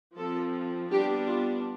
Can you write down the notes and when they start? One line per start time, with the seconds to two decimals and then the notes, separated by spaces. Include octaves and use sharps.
0.17 F3 C4 A4
0.90 G3 B3 D4 G4
1.27 F4